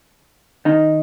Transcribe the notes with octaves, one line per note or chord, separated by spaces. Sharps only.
D#3 D#4